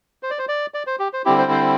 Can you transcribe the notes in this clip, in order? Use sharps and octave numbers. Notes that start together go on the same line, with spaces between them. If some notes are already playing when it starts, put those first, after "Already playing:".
C5
D5
C5
D5
D5
C5
G4
C5
D3 G3 C4 E4 G4
C5
C5